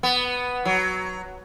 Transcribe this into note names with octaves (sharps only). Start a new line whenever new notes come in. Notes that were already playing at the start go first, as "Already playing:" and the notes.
B3
F#3